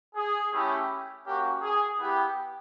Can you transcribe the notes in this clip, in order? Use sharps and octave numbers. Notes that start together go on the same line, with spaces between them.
G#4
A3 C#4 E4 G4
A#3 C#4 F#4 G4
G#4
B3 E4 G4